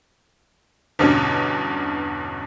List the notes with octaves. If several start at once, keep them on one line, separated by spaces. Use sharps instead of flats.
E2 G2 B2 D3 C#4